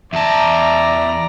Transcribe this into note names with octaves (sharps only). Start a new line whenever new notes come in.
E2 D5 E5 A5 A#5